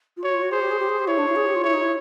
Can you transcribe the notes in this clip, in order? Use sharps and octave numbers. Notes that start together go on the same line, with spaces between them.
F4
F#4 C#5
F4
F#4
G#4 C5
G4
G#4
G4
G#4
G4
E4 C#5
D4
E4
G#4
G4
F4
E4 C#5
D#4
E4